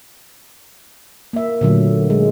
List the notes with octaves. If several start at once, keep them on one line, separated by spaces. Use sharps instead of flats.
A#3 E5
A#2 D3 F#3 A3
G#3